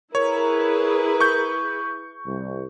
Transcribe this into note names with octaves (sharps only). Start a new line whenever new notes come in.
E4 G#4 A#4 B4 C#5
C#6 G6
C2